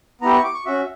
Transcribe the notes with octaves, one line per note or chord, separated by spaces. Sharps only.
B3 E4 G4 A#5
C#6
D6
C#6
C#4 F#4 E5